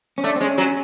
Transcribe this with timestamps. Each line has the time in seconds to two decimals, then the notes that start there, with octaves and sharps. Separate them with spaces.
0.18 C#4
0.24 A3 D4
0.36 C4
0.40 G#3 C#4
0.58 F#3 C#4